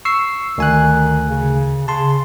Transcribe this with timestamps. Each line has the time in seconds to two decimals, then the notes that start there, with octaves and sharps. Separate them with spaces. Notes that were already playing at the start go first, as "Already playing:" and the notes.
0.05 C#6 E6 C7
0.58 D2 D#3 G#5 F#6
1.29 C#3
1.88 C#3 A5 C6